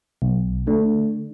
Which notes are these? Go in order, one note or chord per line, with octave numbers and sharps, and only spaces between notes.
B1
D3 A3